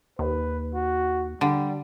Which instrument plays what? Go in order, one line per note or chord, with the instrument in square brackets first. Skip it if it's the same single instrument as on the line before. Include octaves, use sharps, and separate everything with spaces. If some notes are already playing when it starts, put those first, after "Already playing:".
[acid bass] D#2 [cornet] B4
[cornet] F#4
[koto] D3 [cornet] G3